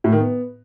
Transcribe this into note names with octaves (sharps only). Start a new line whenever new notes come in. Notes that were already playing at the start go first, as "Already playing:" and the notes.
A2
D#3
B3